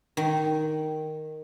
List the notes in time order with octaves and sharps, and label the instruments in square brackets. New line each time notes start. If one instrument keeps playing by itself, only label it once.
[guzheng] D#3